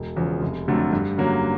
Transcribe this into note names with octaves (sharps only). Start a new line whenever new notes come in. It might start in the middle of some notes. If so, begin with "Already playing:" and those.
Already playing: E1
E2 C#3 F3
F1
F2 D3 F#3 A3
G2
D3 F#3 A#3 C#4